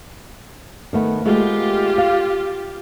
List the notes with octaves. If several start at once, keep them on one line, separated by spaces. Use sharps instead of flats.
D#3 A3 B3
G#3 A3 B3 F4 G4
F5